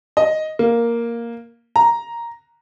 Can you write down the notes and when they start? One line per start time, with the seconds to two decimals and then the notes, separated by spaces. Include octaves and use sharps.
0.17 D#5
0.59 A#3
1.76 A#5